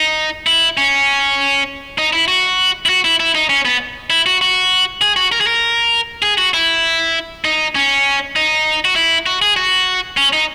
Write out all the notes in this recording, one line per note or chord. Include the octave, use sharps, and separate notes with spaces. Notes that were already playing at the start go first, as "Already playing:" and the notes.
Already playing: D#4
E4
C#4
D#4
E4
F#4
E4
F#4
E4
E4
D#4
C#4
B3
E4
F#4
F#4
G#4
F#4
A#4
G#4
A#4
G#4
F#4
E4
D#4
C#4
D#4
F#4
E4
F#4
G#4
F#4
C#4
D#4